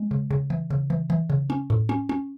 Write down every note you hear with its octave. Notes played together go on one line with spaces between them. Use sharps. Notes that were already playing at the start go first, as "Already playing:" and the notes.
Already playing: G#3
C#3
C#3
E3
C#3
E3
E3
C#3
C#4
A2
C#4
C#4